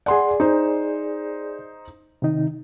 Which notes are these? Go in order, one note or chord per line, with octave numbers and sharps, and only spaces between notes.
G#4 D5 F#5 C6
D#4 C5
C3 D#3 D#4